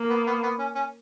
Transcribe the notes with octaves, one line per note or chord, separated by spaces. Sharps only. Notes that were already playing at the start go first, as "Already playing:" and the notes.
Already playing: A#3
B3
B3
B3
C#4
C#4